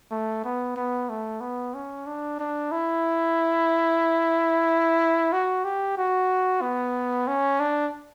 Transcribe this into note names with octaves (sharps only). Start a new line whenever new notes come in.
A3
B3
B3
A3
B3
C#4
D4
D4
E4
F#4
G4
F#4
B3
C#4
D4